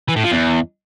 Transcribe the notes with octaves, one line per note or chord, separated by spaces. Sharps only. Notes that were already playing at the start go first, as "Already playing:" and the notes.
E3
A2
F3
E2